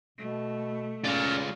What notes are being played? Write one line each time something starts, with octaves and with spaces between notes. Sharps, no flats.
B2 A3
G#3 C#4 F4 D5 F5